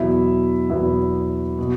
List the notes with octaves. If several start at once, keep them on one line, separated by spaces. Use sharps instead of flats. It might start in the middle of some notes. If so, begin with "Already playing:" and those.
Already playing: E2 B2 F#3 B3 E4 E5
E2 B2 F#3 B3 E4 E5
B2